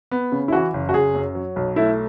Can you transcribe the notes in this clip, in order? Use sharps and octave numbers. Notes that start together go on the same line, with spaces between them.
B3
C#3
E4
E3 F#4
F#1
F#4
F#1 G#4
F#2
F#3
B1
A3 E4